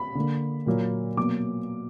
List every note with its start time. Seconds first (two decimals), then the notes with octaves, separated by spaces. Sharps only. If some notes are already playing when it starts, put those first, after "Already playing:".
Already playing: B5
0.15 D3 A#3
0.66 A#2 F#3 A#3
1.17 B2 F#3 A#3 D6